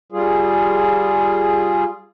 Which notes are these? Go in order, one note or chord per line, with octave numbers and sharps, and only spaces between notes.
G3 F4 G#4